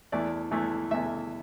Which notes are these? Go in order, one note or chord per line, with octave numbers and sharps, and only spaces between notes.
E2 E3 A3 D5
E2 E3 A3
E2 E3 A3 E5